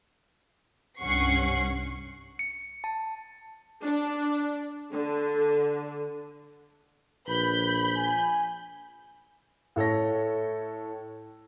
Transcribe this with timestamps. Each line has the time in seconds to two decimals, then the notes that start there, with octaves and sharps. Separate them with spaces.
1.00 C2 G2 C#4 F#5 C#6 C7
2.39 C#7
2.84 A5
3.83 D4
4.91 D3
7.28 A#1 B4 B5 G6
7.96 G#5
9.76 A2 A4 C#5 A#6